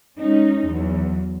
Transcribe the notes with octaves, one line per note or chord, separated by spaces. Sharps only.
G#3 C#4 D#4
E2 F#3